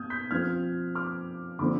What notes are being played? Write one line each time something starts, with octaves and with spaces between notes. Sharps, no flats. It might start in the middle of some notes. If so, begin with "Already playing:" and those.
Already playing: B2 D#6 F6 G6 G#6
G6 B6
F3 C4 F4 F6 G#6
D6 F6
D3 F3 C4 B5 D6